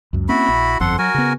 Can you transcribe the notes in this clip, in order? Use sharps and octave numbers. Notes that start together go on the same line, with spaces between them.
C#2 F#2
A#3 C4 C#4 E4 F#4 B5
A#1
G1 F2 A4 F#5 C6
F#3 F#4 A#4 G#5
C#3 B3